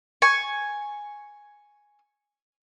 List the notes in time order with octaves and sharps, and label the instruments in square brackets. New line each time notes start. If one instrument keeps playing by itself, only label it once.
[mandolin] G#5 C#6